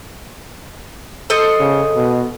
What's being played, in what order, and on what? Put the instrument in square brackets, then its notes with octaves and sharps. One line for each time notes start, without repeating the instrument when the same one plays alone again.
[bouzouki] A4 C5 D#5
[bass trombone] C#3
B2